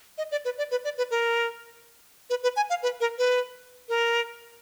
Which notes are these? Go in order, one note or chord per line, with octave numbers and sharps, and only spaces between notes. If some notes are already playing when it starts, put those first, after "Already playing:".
D#5
D5
B4
D5
B4
D5
B4
A#4
B4
B4
G#5
F5
B4
A#4
B4
A#4